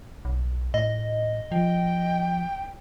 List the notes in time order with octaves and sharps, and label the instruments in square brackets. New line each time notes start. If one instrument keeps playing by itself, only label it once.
[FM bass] B1
[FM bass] A2 [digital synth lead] D#5
[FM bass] F3 [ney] G5